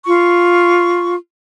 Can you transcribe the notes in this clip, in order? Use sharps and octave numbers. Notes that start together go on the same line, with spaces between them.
F4 C#6